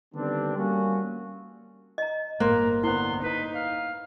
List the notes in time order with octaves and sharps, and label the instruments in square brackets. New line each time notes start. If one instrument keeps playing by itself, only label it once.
[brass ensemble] D3 D#3 G3 B3 C4 D4
G3 A#3 C#4 F#4
[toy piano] D#5 A#5
[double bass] G1 A2 [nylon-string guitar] A#3 [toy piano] C5 C6 [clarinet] A#5
[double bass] D3 B3 [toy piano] E4 C5 [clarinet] C6
[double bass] D#4 [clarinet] B4
[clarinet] F5